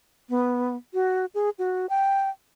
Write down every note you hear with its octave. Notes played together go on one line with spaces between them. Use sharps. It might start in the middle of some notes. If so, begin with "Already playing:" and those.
B3
F#4
G#4
F#4
G5